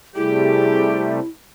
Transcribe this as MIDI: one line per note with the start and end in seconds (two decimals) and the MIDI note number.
0.16 1.20 48
0.16 1.20 55
0.16 1.20 57
0.16 1.28 64
0.16 1.14 67
0.16 1.00 68